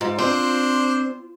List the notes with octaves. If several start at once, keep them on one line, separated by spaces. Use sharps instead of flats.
G#2 F4
C4 D4 C5